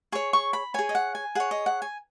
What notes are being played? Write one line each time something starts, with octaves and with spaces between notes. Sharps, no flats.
G#4 C#5 C#6
C#6
B5
G#4 C#5 G#5
D#5
F#5
G#5
G#4 C#5 F#5
D#5
F#5
G#5